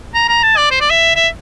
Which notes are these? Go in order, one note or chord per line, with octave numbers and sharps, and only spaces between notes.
A#5
A#5
A5
D5
C5
D5
E5
E5